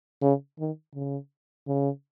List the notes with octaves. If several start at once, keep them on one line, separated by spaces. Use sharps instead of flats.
C#3
D#3
C#3
C#3